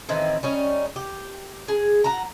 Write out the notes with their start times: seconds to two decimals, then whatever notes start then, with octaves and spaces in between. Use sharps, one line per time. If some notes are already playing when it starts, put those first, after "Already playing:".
0.09 A2 D#3 E3 C4
0.43 G3 C#4 D#4
0.96 G4
1.68 G#4
2.04 F#4 A#5